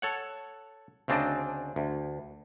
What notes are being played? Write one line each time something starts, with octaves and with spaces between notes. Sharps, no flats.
A4 C#5 F#5
D2 C#3 C4 D4 D5 D#5
D2